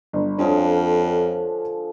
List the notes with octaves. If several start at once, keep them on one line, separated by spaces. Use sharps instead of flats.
G1
F2 D3 F3 G#3 C#4 D4